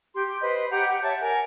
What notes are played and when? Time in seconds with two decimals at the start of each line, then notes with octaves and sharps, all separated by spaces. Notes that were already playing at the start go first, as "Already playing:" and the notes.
0.14 G4 C6
0.41 B4 C5 D#5
0.70 G4 F#5 A#5
0.88 G4 F#5
1.02 C#5 E5 A5
1.20 A#4 F#5 G#5